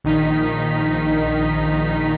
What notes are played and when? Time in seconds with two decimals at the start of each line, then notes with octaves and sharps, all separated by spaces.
0.04 A#1 D#3 D#4 B6